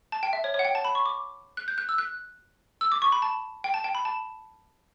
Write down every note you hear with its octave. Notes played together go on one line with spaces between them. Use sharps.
A5
G5
E5
C#5
C#5
F#5
G5
A5
B5
C#6
D6
F#6
G6
F#6
E6
F#6
E6
D6
C#6
B5
A5
G5
A5
G5
B5
A5